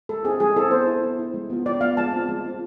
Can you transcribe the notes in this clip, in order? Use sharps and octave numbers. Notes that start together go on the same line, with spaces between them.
G#3 A4
C4 E4 G#4
G#3 G#4
C4 E4 A4
B3 C5
E4
B3
E4
G#3
B3 F4
G#3 D5
B3 F4 F5
G#3 A5
C4 F4
G#3
C4 F4